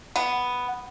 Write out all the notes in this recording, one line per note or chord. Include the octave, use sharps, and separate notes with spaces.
B3